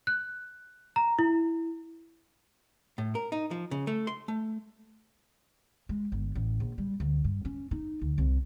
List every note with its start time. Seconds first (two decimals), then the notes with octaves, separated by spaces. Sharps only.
0.07 F#6
0.96 A#5
1.19 E4
2.98 A2
3.15 A#4
3.32 D#4
3.51 F3
3.71 C#3
3.87 A3
4.07 C6
4.28 A3
5.89 G#3
6.12 G1
6.35 A1
6.60 A#1
6.78 G3
7.00 D2
7.24 G2
7.45 C#4
7.71 D#4
8.01 D2
8.18 C2